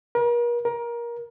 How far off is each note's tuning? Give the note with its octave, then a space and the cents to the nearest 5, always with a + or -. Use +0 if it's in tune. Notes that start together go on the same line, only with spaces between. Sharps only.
A#4 +40
A#4 +20